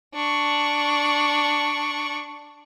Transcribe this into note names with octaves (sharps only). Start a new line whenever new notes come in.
D4 C#6